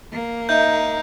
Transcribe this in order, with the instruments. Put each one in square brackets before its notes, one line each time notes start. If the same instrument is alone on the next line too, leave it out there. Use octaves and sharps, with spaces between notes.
[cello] A#3
[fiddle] D#4 [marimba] D#5 E5 [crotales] G6